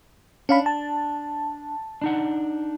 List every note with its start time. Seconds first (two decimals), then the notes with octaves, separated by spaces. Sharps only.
0.49 C#4 D4 F5 B5
0.66 A5
2.02 D4 D#4 F#5